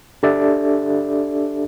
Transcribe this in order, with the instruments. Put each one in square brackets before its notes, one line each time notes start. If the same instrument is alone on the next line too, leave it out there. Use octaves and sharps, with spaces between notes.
[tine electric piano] D4 G4 A4 D5 E5